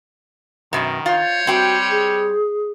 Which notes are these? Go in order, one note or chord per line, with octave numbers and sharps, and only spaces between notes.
F#2 B2 D#3
F4 C5 C#5
G3 C4 F#4 G5
G#4